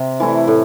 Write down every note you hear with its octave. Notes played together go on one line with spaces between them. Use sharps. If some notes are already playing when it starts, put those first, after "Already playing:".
Already playing: C3
E3 A3 E4
A2